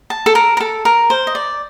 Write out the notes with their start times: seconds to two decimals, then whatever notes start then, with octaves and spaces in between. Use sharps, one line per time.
0.10 A5
0.26 A4
0.35 A#4
0.57 A#4
0.60 A4
0.85 A#4
1.10 C5
1.27 D#5
1.35 D5